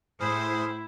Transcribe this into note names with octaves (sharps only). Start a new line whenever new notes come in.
A2 E4 G#4 C5 D#6 F6